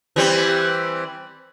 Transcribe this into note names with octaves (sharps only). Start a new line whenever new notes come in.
E3 G3 C4